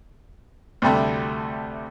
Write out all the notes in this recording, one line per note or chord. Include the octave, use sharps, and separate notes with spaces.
D2 C3 G3 A3